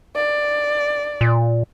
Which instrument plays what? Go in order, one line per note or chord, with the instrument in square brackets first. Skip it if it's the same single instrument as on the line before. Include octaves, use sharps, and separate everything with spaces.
[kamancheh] D5
[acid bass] A#2